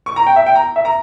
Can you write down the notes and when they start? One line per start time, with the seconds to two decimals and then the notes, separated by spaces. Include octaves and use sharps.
0.06 C#6
0.16 A#5
0.27 G5
0.36 E5
0.46 G5
0.55 A#5
0.76 E5
0.85 A#5